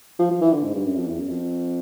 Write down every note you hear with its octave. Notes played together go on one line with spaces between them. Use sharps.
F3
F3
E3
D3
G#2
G2
F#2
F2
E2
F#2
F2